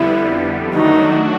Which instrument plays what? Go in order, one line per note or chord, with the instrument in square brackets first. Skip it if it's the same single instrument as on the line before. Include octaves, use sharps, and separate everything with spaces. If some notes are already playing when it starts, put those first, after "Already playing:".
Already playing: [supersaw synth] F2 D3 G3 B3 [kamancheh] E4
[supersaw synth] D#3 F#3 A3 D4 F#4 [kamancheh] D#4